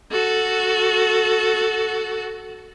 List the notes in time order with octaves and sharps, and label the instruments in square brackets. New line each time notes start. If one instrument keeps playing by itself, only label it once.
[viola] F#4 A4